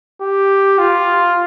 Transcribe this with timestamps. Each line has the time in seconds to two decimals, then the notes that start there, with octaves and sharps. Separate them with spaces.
0.21 G4
0.79 F4